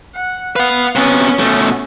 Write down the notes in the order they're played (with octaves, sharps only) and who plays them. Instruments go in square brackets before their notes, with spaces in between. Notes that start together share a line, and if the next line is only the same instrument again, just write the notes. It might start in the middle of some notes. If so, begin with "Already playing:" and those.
[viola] F#5
[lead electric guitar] B4 F#5 [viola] F5
[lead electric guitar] C3 B3 [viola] C#4
[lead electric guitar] B2 A3